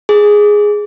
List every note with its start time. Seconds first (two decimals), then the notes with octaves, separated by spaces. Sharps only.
0.09 G#4